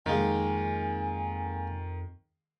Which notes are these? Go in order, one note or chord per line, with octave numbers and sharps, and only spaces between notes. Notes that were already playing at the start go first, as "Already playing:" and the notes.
F2 D#3 G#3 A#3 D#4 G#5